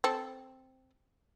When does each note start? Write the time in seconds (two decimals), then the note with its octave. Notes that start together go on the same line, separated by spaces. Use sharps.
0.04 C4 A4